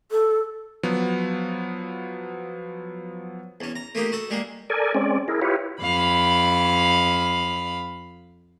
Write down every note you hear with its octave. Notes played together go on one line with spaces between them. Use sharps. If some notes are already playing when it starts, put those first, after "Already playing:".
A4
F3 F#3 B3
E2 C#4
A#5
A3 A#3 D#4 G4
F#4 A4
G3 G#3 A#3
A4 A#4 D5 G#5
G#3 C4 C#4 D5
E4 G#4 A#4
E4 F4 G4 B4 C#5
F2 F5 B5